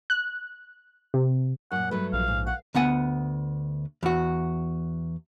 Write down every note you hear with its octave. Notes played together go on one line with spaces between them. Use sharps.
F#6
C3
F#2 A#2 F#5
G2 F#3 A3 B4
A#1 F5
G#2
F5 F#5
D2 B3 F#5 G#5
E2 F#4